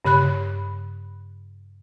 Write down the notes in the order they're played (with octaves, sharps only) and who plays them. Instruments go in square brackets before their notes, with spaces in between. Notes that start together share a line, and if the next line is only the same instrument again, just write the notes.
[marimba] G2 C#3 B5 F#6